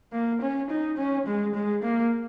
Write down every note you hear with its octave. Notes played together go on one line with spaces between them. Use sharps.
A#3
C#4
D#4
C#4
G#3
G#3
A#3